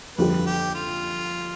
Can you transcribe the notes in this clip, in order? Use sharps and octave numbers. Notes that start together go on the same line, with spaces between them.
F2 D3 G3 B4
G4
F4